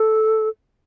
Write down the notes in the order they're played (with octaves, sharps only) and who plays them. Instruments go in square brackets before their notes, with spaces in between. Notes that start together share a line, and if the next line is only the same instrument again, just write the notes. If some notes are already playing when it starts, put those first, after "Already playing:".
Already playing: [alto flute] A4